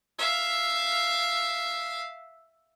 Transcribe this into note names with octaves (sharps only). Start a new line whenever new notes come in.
E5 F5